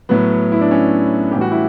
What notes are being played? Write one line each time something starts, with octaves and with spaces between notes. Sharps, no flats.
A2 F#3 B3
E4
D4
C#4
A2 E3 G3 G4
F#4
E4